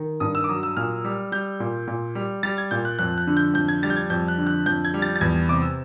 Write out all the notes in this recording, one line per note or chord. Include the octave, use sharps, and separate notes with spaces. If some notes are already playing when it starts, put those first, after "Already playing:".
Already playing: D#3
G2 D#6
E6
D6
F#3 D#6
E6
A#2 F6
G3
G3 G6
A#2
A#2
G3
G3 A6
G#6
A#2 G6
F#6
F2 F#6
F#6
D3
G6
F2 G6
G#6
G3 A6
G6
G#6
F2 G6
F#6
D3
F#6
F2 G6
G#6
G3
A6
A6
E2 G#6
C3 D6
E6